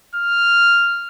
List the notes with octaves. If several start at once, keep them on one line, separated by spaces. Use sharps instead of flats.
F6